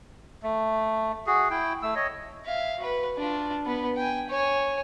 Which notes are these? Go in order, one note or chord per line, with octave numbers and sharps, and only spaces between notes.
A3
F#4 G#4
E4 G5
A3 E6
C#5 D#5
E5 F5
F#4 B4
D4 F4
B3 B4
G5 G#5
C#5 G#5